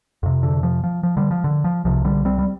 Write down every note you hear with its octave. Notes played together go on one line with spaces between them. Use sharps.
F2 C3
D3
F3
F3
F3
D3 G3
F3
D3
F3
C2 C3 F3
D3 G3
G3 C4
G3